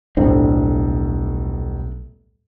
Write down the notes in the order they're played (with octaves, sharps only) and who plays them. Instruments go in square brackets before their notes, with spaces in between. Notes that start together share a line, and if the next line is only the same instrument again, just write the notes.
[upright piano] D#1 A2 [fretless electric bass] B1 C4 D4